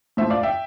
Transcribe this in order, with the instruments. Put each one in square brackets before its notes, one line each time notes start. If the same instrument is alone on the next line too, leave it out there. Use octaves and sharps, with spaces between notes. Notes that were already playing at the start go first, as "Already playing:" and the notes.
[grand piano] A2 F3 C5 E5
D5 F5
E5 G5